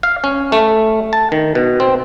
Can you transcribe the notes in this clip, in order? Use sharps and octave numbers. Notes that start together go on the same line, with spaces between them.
F5
C#4
A3
A5
D#3
B2
C4